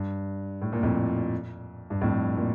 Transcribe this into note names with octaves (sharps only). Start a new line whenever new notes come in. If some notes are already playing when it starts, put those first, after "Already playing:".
Already playing: G2
A2
A#2
F2 A2
G2
F2 A2
A#2